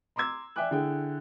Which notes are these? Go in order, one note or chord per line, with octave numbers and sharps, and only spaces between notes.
A#5 C6 D6 E6 G#6
D5 E5 G5 G#5 D6 F#6
D3 E4 G#4 G5